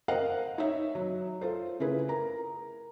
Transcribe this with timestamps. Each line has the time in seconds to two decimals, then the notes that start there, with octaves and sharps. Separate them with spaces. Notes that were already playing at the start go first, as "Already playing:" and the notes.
0.08 A#4 C5 D#5 F5 F#5
0.58 D#4 C#5 E5
0.95 F#3
1.41 F4 A4 C5
1.80 C#3 A3 E4 F4 G#4 B4
2.08 A#4 A#5